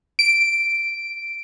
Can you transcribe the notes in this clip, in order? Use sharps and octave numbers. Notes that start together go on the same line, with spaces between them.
D7